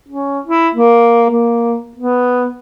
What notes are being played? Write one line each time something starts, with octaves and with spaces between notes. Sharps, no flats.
C#4
E4
A#3
A#3
B3